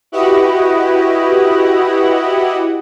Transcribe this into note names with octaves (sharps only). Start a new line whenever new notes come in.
E4 F#4 G4 B4 D#5 F#5